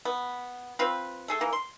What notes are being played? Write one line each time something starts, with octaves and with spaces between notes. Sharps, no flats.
B3
C4 F4 B4
A3 G#4 A4
E3 A#3
C6